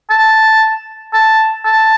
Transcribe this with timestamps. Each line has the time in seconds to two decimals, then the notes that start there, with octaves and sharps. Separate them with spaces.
0.10 A5
1.13 A5
1.65 A5